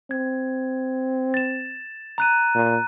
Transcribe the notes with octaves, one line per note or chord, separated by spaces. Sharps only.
C4 G#6
A6 E7
A#5 F#6 D#7
A#2